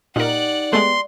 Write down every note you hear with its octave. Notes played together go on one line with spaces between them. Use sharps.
A#2 D#4 G4 A#4 D5 D#5 F#5
G#3 A3 B3 G4 C6